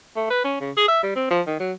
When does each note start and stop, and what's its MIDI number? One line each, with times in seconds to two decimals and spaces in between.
0.16 0.28 57
0.30 0.42 71
0.45 0.56 61
0.61 0.71 49
0.77 0.88 68
0.88 1.02 76
1.03 1.15 55
1.16 1.30 60
1.31 1.41 53
1.47 1.58 51
1.60 1.72 54